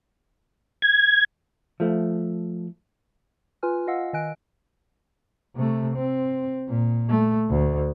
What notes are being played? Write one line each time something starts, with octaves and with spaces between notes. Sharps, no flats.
G#6
F3 A3
F4 B4 G#5 F6
F4 D#5 F5 F#5 E6
D#3 D#5 G#5 F#6 D7
C3 A3
C4
A#2
A3
D2